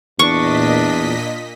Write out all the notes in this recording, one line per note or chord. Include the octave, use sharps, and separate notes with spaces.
E2 A#2 D4 D#5 C#6 B6